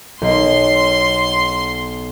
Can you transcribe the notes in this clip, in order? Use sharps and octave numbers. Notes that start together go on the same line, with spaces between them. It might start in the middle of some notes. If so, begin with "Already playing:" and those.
B1 C6